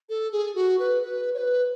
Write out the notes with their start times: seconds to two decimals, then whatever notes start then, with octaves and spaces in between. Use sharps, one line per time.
0.09 A4
0.32 G#4
0.55 F#4
0.79 B4
1.03 B4
1.34 C#5
1.38 B4